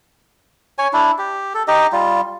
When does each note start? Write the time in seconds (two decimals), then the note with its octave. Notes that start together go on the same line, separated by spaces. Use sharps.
0.78 C#5 G#5
0.93 D4 E4
1.18 G4
1.54 A4
1.68 D#4 G4 D#5
1.92 G3 F4